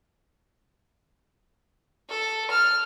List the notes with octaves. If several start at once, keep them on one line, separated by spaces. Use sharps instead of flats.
A4
F6